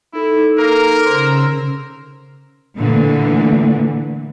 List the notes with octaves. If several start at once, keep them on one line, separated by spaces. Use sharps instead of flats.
D#4 E4 A4
A#3 A#4
C#3 C5 E6
A#2 D3 E3 A3